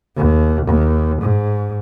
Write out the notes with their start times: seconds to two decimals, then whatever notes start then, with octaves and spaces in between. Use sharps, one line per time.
0.17 D#2
0.67 D#2
1.22 G#2